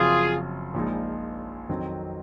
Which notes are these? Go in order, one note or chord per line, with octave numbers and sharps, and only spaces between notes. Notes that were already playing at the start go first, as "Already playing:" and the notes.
Already playing: F#1 F#2 F3 C4 F4 F#4 G#4
A#1 A#2 F3 G#3 D#4
F2 D#3 F#3 C4